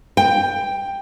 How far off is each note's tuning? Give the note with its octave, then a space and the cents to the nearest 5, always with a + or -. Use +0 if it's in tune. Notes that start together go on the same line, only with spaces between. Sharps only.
G5 +10